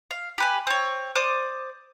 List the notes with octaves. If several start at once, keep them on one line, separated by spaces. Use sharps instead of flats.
F5
G4 B4 G#5
C4 C#5
C5 D5 D6 D#6